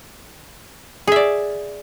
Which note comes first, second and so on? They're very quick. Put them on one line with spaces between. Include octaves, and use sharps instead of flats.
G#4 E5 D5